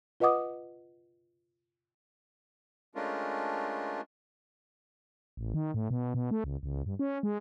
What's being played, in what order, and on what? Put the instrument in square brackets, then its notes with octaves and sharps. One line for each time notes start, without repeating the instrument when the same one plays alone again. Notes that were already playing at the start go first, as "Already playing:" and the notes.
[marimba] F4 B4 D#5 F#5 D6 D#6
[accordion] G#3 A3 C#4 D4 F4 A#4
[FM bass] A1
D#3
A2
B2
B2
A3
C#2
C#2
G2
C#4
G#3